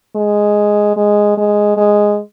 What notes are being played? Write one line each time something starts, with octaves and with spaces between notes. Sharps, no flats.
G#3
G#3
G#3
G#3